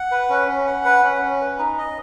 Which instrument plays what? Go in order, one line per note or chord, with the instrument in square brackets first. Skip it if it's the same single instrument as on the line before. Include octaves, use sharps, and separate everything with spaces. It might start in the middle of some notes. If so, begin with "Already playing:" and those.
Already playing: [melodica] F#5
B4
C#4
C#4
F#5
B4
C#4
C#4
B4
D#4
D#5